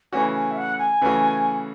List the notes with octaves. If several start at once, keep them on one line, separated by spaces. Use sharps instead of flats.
C#3 E3 A3 C#4 F#4 G#5
G#5
E5
F#5
G#5
C#3 E3 A3 C#4 F#4